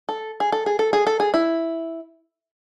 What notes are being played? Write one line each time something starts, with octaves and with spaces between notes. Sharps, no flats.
A4
G#4
A4
G#4
A4
G#4
A4
G#4
E4